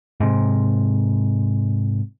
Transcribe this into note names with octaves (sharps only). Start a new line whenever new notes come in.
G#2 C3